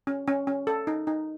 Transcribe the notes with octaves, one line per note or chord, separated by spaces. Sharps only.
C#4
C#4
C#4
A4
D#4
D#4